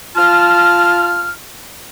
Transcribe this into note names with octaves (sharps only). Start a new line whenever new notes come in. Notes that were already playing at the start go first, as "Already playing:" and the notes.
F4 A5 F6